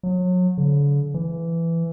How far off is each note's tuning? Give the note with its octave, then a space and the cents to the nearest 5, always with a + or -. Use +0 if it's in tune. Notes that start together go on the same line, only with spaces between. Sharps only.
F#3 -30
D3 -45
E3 +15